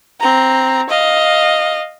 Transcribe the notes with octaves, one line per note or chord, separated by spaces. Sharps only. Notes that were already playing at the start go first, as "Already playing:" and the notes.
C4 A#5
D#5 F5